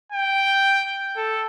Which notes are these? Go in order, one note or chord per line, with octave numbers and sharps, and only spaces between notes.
G5
A4